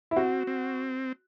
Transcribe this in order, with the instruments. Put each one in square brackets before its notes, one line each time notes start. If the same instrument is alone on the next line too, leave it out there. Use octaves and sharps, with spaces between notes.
[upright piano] E4
[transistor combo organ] C4 [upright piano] F#4
[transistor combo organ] C4